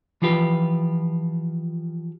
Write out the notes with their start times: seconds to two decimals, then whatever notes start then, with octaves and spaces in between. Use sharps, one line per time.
0.22 E3 F3 F4 G4 B4